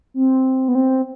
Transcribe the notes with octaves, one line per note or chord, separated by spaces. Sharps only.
C4
B3
C4